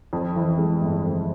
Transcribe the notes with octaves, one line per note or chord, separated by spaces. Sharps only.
F2
E3
G#3
G1
F2